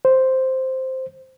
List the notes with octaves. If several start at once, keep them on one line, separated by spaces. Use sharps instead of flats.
C5